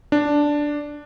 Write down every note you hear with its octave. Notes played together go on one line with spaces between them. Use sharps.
D4